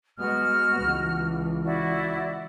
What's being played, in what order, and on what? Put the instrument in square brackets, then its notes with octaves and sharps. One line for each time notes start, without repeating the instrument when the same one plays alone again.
[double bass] G#3 B3 [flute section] F#4 F6
[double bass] C#2 E3
[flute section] E4 F#4 D5